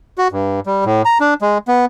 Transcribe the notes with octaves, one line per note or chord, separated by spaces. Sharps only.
F#4
G2
G3
A2
A#5
D4
G#3
B3